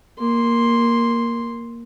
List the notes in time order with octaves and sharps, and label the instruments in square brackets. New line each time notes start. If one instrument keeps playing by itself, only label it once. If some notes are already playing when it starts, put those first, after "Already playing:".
[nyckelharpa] A#3 C6